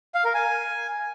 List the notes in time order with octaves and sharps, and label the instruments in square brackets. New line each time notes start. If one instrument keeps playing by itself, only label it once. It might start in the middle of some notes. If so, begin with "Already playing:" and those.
[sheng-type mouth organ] F5
A#4
G#5